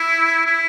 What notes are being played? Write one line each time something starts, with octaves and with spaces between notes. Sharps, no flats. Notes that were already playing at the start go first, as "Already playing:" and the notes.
Already playing: E4
E4